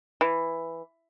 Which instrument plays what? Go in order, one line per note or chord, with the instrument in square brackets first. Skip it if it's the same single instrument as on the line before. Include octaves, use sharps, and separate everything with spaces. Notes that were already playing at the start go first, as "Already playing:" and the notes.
[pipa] E3